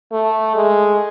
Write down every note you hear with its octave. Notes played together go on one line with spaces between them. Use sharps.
A3
G#3